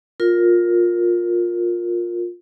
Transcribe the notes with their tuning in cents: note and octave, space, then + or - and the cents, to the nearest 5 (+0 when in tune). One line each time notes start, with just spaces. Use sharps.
F4 +15 A#4 +0